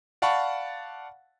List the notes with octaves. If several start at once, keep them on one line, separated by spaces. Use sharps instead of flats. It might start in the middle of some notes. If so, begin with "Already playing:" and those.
D5 F5 F#5 A5 B5 C#6